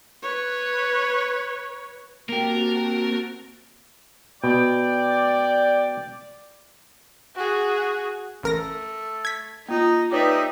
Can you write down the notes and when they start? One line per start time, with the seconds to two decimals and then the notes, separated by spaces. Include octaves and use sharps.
0.22 B4 C#5
2.29 A#3 C4 F#4 G4 A#4 A5
4.44 B2 D5 G5
7.36 F#4 G#4
8.43 A1 A3 A#4 A#6
9.25 G#6 B6
9.69 A#3 D#4 F4
10.12 D#4 G4 B4 C#5 D5 E5